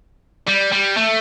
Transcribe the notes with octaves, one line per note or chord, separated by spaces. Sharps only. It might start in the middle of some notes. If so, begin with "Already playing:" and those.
G3
G3
A3